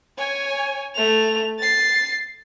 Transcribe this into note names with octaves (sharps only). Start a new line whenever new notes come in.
C#5 G#5
A3 F7
A6 C7